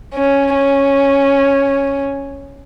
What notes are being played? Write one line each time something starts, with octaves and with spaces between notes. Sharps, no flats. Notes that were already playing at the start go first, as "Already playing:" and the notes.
C#4
C#4